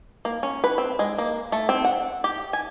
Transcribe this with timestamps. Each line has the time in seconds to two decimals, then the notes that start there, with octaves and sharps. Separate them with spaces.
0.25 A#3
0.43 C#4
0.64 B4
0.78 C4
0.99 G#3
1.18 A#3
1.52 A3
1.69 C4
1.85 F#5
2.24 G4
2.53 G#5